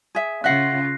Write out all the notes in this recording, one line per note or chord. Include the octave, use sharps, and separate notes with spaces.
G#4 E5
C#3 F4 E5 F#5 F#6 A#6 C7